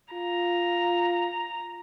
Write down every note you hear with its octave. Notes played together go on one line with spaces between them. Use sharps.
F4 A#5